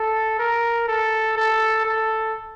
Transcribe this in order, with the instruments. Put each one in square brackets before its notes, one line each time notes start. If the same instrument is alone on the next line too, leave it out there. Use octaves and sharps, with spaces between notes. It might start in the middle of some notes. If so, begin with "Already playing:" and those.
Already playing: [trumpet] A4
A#4
A4
A4
A4